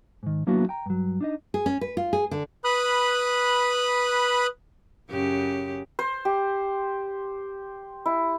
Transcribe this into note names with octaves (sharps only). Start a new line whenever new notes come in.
G#2 D#3
F#3 A#3 B3 D4 E4 F#4
G5 A#5
G2 F#3
D4 D#4 D#5
G#4
C#4
B4
F4
G#4
D3
B4 B5 D#6 F#6
F#2 C#3 G4
C5
G4
E4